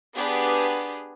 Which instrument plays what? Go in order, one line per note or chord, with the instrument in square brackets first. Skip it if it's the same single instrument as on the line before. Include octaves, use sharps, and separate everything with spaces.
[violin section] B3 D4 G4 G#4 B4